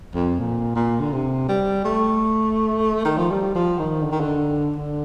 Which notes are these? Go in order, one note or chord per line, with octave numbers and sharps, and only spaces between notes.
F2
A#2
A#2
D3
C3
G3
A3
D#3
F3
G3
F3
D#3
D3
D#3
D3
D3